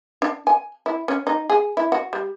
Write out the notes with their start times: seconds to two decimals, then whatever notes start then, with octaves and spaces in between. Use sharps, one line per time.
0.22 D4
0.47 G#5
0.86 E4
1.08 C#4
1.27 D#4
1.50 G#4
1.77 E4
1.92 F#4
2.13 G3